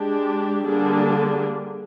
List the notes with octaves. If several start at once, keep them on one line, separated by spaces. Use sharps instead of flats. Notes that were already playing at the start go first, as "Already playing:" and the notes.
Already playing: G#3 D4 G4
D3 G3 A#3 D4 G#4